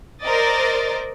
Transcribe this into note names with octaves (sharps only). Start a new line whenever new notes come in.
A#4 C5 D5 D#5 A6